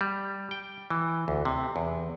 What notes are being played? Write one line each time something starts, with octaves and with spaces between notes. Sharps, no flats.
G3
G5
E3
D2
C3
E2